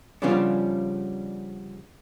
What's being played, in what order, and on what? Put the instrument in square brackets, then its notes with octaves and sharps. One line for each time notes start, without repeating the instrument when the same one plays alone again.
[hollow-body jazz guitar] C#3 F3 G3 B3 C#4 D4